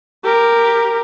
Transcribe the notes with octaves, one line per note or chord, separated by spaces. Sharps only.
G4 A#4